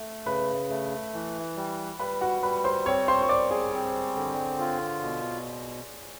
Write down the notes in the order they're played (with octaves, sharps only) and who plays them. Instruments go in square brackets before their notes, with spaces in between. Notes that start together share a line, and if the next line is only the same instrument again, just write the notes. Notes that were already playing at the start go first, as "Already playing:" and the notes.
Already playing: [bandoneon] A3
[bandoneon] C#3 [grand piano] B4 B5
[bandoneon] A3
E3
G3
[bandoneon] G3 [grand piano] B4 B5
[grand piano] F#4 F#5
[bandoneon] G3 [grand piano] B4 B5
[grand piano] C5 C6
[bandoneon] C4 [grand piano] C#5 C#6
[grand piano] C5 C6
C#6
[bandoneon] G3 [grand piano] D5 D6
[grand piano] G#4 G#5
[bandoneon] C4
D3
F4
B2